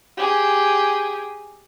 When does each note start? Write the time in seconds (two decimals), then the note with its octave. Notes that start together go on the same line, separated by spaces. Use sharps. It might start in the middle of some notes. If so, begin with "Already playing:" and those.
0.17 G4 G#4